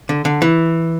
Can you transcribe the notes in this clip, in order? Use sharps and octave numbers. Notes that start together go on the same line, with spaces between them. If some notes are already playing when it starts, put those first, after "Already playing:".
D3
D3
E3